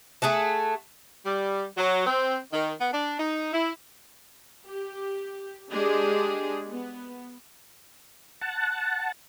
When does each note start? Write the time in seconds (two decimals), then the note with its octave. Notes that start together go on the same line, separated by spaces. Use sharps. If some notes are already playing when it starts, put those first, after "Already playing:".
0.22 A3 G#4 F#5 A5
1.25 G3
1.77 F#3
2.06 C4
2.52 D#3
2.79 B3
2.93 D4
3.19 D#4
3.53 E4
4.67 G4
5.73 G#3 D4 G4 G#4
6.69 B3
8.41 F#5 A5